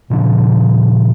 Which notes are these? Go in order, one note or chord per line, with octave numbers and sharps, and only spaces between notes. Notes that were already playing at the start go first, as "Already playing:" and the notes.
A#2 C#3 F3 D4